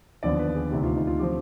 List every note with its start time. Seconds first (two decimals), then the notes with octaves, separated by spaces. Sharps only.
0.23 D#2 D3 F3 B3 D5
0.39 B4
0.55 G#4
0.71 D2 C3 D#3 G4
0.83 F4
0.95 D#4
1.07 F4
1.19 D3 F3 C4 G4